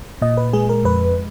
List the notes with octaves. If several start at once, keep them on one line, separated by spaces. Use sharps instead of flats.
A#2 D#5
B4
G#3 G#4
A#4
F2 B4